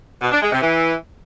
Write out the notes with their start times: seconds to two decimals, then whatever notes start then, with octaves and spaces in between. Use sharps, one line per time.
0.21 B2
0.32 D4
0.42 G#3
0.52 C3
0.62 E3